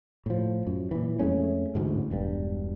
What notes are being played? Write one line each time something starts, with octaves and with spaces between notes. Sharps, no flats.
A2 F3
F#2
A#2 E3
F2 G#3 A3 C#4
A1 D2 G#2
E1 G2